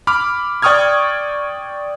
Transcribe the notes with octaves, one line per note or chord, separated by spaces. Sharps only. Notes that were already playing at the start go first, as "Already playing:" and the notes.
B5 D6 F6
D5 G5 C#6 D#6 F6 G#6